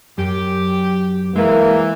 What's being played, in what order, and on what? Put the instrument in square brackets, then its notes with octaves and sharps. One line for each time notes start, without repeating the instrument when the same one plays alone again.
[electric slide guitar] F#2 [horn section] G4
[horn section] E3 [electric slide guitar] G#3 [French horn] A#3